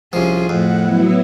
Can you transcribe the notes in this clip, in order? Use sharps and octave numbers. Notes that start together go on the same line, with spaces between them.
C2 F3 C#4 F4 G#4
F2 A2 F#5
F#3 B3 E4